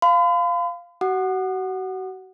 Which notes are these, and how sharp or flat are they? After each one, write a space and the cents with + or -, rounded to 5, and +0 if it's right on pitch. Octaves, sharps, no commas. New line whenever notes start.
F5 +0 B5 +45
F#4 +35 F#5 +0 D#6 -45